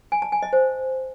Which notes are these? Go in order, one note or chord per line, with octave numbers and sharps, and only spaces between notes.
G#5
A5
G#5
D#5
C5